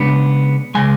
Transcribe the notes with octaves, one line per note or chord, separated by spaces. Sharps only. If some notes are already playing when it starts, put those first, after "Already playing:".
Already playing: C#3 G#3 B3 D4
C#3 G#3 G#5